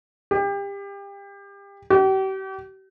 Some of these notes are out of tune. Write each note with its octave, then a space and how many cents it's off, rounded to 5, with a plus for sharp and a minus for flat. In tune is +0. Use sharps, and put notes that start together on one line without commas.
G4 +30
G4 -40